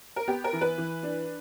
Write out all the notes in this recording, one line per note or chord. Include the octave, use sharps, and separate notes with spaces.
A#4
B3 G4
A#4
E3
B4
E3
D4